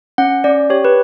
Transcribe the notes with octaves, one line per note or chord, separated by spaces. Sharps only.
C#4 F#5
C#4 D5
G4 C#5
B4